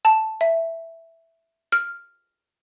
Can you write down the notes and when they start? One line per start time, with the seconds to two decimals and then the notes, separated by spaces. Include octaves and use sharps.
0.05 A5
0.41 E5
1.72 F6